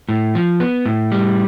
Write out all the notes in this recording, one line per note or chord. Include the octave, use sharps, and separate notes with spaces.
A2
F3
B3
A2
G3